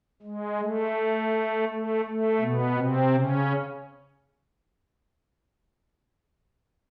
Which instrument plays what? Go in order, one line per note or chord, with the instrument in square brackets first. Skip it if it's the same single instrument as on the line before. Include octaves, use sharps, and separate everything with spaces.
[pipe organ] G#3
A3
A3
A3
B2 B3
C3 C4
C#3 C#4